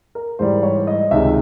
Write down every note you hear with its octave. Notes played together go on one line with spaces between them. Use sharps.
A#4
G#2 E3 G3 C5
C#5
D#5
C#2 C3 D#3 E5